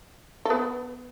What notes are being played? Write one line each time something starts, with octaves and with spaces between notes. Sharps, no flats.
A4
B3 B4